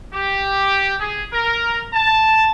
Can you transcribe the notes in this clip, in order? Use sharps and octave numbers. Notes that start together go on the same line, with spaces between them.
G4
G#4
A#4
A5